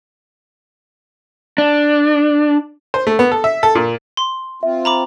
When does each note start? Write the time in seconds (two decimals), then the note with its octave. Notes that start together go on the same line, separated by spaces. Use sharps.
1.58 D4
2.94 C5
3.07 A3
3.19 B3
3.32 A4
3.44 E5
3.63 A4
3.75 A#2
4.17 C6
4.63 C4 F4 E5
4.85 A#5 B5 D6